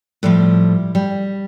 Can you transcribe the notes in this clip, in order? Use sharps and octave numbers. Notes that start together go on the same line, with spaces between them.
A2 F3 G3
G3